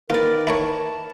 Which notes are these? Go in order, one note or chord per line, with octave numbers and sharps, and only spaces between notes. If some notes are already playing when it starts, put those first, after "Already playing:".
D#3 F4 A#4 B4 D5
E4 A#4 C#5 A5